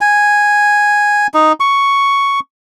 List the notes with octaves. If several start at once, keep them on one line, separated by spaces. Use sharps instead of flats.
G#5
D#4
C#6